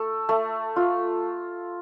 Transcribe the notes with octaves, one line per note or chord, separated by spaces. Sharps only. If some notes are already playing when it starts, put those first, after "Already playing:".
Already playing: A3 A4
A3
F4